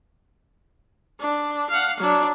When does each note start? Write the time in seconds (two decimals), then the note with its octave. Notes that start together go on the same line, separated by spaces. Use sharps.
1.20 D4
1.70 F5 F#5
2.00 F#3 D4